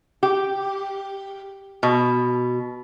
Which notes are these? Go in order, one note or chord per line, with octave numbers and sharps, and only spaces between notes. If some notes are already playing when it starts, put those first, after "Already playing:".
G4
B2